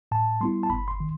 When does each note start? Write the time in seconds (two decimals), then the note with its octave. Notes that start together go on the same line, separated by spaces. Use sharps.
0.12 A2 A5
0.41 G3 B3 E4 C6
0.63 A5
0.70 G1 B5
0.88 C6
1.00 D#3